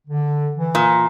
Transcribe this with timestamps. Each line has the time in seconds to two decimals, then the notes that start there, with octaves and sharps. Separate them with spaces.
0.08 D3
0.56 E3
0.75 A#2